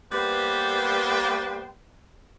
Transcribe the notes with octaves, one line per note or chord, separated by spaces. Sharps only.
G3 A#3 B3 B4 C5 G5